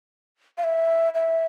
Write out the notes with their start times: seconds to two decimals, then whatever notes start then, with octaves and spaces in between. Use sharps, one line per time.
0.58 F5
0.64 E5
1.15 E5